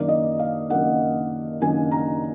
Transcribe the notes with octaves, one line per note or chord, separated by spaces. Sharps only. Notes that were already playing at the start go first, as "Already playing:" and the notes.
Already playing: F#2 D#3 A#3 D4 D5
D#5
F5
F#2 D#3 A#3 D4 F#5
F#2 D#3 A#3 D4 G#5
A#5